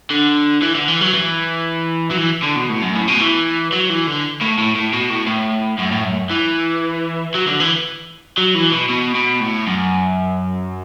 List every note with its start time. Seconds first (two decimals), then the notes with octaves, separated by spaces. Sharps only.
0.11 D3
0.62 E3
0.75 D3
0.88 E3
1.01 F#3
1.14 E3
2.11 F#3
2.17 E3
2.43 D3
2.56 B2
2.69 A2
2.82 F#2
2.95 A2
3.08 B2
3.20 E3
3.72 F#3
3.89 E3
4.07 D3
4.41 A2
4.58 A2
4.75 A2
4.93 B2
5.10 A2
5.27 A2
5.79 F#2
5.92 A2
6.05 F#2
6.31 E3
7.34 F#3
7.47 D3
7.60 E3
8.38 F#3
8.55 E3
8.72 B2
8.89 B2
9.15 B2
9.41 A2
9.67 F#2